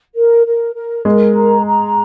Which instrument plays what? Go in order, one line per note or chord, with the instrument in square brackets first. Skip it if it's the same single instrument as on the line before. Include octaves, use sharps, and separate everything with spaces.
[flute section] A#4
A#4
A#4
[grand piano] G#3 [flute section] A#4
[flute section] A#5
A#5